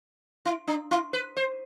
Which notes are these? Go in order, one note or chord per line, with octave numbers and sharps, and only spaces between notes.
E4
D4
E4
B4
C5